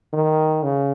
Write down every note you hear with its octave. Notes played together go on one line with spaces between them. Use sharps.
D#3
C#3